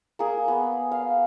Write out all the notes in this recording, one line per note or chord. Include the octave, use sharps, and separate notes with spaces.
A#3 G#4
B3
F5